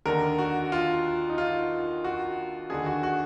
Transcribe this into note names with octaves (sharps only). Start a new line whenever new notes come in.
D#2 D3 A#4
F#4
F4
D#4
F4
F#4
D#2 D3 G#4
F#4
F#4